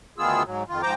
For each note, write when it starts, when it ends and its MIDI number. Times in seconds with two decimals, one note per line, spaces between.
0.18 0.43 38
0.18 0.43 51
0.18 0.43 59
0.18 0.43 65
0.18 0.43 68
0.18 0.43 88
0.45 0.63 44
0.45 0.63 54
0.69 0.82 41
0.69 0.82 51
0.69 0.82 65
0.83 0.94 44
0.83 0.94 53
0.83 0.94 72
0.83 0.94 79
0.83 0.94 82
0.83 0.94 86